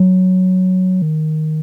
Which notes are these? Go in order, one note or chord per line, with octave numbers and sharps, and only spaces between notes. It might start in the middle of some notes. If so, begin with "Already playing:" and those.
Already playing: F#3
D#3